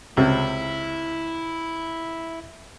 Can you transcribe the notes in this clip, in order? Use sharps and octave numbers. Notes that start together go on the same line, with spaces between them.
C#2 C3 E4